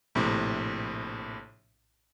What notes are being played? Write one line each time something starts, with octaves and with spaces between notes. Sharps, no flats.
A#1 A2 C3